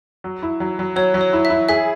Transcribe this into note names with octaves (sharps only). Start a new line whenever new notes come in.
F#3
E4
F#3
F#3
F#3 C#5
F#3
C#5
E4
E5
E4
G#4 E5